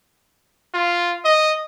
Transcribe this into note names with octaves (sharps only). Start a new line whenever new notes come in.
F4
D#5